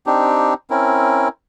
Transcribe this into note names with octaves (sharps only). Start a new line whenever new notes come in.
C4 D4 D#4 G4
C4 C#4 E4 A#4